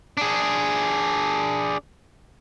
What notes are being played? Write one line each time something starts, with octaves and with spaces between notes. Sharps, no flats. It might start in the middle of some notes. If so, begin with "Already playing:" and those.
D4 G#4